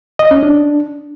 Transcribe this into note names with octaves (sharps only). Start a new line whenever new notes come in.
D#5
C#4
D4